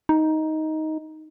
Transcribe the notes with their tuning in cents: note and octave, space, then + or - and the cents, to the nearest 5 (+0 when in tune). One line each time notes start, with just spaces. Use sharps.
D#4 +10